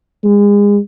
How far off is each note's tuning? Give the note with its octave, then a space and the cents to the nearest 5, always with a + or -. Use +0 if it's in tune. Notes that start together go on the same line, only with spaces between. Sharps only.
G#3 -30